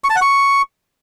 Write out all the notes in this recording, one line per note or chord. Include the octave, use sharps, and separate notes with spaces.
C#6
A5
F#5
C#6